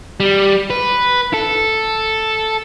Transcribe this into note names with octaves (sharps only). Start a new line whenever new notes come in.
G3
B4
A4